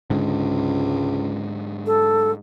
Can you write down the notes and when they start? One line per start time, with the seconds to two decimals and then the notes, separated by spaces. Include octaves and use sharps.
0.10 C#2 G#2 D3
1.86 A4